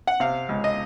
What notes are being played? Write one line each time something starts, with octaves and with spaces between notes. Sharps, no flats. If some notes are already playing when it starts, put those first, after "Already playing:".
F#5
C3 F5
C#2
D#5